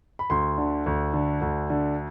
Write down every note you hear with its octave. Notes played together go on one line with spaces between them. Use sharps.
B5
D2 C6
D3
D2
D3
D2
D3